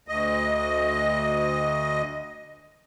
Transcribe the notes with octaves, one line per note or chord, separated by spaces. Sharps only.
D2 D#5